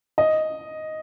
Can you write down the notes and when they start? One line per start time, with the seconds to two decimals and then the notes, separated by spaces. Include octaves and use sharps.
0.18 D#5